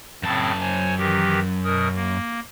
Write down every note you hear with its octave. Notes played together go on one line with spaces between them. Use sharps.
F#2 A2 C#3 C4 A5
C5 C#5 G#5
D#3 E3 G4
B2 A#4 D#6
A#3